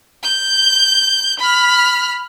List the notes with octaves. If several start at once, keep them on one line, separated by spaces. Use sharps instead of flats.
G6
B5 F6